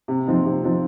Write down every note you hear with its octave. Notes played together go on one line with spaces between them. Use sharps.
C3
F3 C4 D#4
C3
F3 C4 D#4